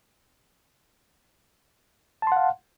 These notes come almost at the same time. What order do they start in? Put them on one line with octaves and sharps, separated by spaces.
A5 C6 F#5 F5